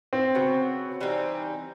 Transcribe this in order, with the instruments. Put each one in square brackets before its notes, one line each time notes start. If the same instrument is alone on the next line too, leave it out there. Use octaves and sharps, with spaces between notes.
[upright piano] C4
[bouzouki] C#3 F#3 B3
E3 G3 C4 D#4